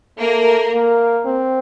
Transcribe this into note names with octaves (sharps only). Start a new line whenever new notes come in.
A3 A#3 A#4
A#3
C4